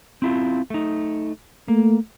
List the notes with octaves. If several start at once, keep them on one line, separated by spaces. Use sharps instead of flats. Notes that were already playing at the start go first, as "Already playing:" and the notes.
C4 E4 F4
A3 D#4
A3 A#3